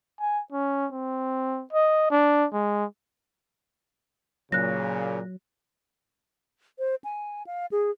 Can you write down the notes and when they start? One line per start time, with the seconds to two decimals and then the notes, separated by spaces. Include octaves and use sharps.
0.20 G#5
0.52 C#4
0.93 C4
1.73 D#5
2.11 D4
2.53 G#3
4.52 A#2 C#3 F#3 F#6 A#6
6.79 C5
7.04 G#5
7.47 F5
7.72 G#4